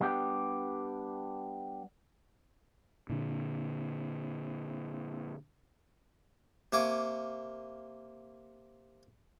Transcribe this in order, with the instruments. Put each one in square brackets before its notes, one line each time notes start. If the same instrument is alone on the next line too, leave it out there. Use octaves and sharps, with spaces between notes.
[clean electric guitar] G3 B3 D4 G4
[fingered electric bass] A#2 D3
[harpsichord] C3 A#3 G#5 C#6 D6